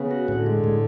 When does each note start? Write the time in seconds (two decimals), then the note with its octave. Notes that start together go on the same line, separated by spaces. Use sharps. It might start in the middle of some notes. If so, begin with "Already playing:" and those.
Already playing: C#3 B3
0.11 F#4
0.28 A2 D3
0.46 G#3
0.64 A2